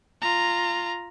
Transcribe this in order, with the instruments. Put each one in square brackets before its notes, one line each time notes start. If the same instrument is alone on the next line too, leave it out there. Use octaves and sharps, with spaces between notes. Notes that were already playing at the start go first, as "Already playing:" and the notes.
[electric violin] F4 A#5